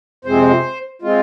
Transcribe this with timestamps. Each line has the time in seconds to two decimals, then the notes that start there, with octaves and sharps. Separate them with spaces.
0.25 F2 C3 G#3 C4 C5
1.02 G#3 C4 F4